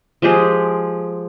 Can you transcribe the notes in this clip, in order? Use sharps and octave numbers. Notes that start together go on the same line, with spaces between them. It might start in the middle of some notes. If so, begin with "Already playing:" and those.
F3 G#3 G4 G#4